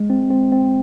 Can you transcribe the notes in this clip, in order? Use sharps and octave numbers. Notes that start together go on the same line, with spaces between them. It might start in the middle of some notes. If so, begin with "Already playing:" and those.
Already playing: G#3
C4
C4
C4